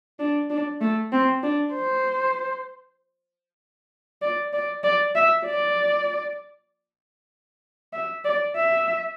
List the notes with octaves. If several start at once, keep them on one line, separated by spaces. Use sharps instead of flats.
D4
D4
A3
C4
D4
C5
D5
D5
D5
E5
D5
E5
D5
E5